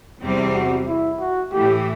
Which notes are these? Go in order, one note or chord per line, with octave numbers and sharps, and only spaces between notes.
E2 C3 G3 C4
F#4
E4
F#4
A2 E3 A3 G4